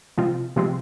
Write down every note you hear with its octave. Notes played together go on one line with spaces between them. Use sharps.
C3 F3 G#3 C4 F4
C3 F3 G#3 C4